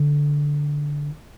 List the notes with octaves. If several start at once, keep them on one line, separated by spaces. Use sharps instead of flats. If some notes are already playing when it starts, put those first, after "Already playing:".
Already playing: D3